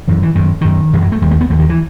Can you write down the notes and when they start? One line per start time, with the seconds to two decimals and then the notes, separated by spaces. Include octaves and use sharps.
0.08 F#2 E3
0.23 E3
0.35 F#2 D#3
0.61 F#2 D#3
0.93 F#2 E3
1.02 F#3
1.12 A3
1.22 D#2 G3
1.31 A3
1.41 B3
1.50 D#2 A3
1.59 D#3
1.69 E3